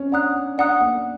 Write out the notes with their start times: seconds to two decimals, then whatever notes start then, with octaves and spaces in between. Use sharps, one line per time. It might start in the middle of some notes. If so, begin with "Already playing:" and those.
Already playing: C4 C#4
0.12 D4 D5 F#5 A#5 D#6 F#6
0.58 D4 D5 F#5 A#5 D#6 F#6
0.81 A#3